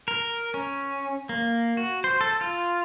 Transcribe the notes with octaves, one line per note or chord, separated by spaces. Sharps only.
A#4
C#4
A#3
F#4
C5
A4
F4